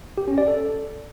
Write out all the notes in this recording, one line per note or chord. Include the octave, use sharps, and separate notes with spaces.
G4
C#4
D5
A4